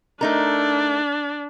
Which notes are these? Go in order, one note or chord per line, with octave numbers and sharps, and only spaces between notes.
A3 D4 D#4 A#4